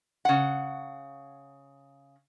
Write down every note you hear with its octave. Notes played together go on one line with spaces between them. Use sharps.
C#3 F#5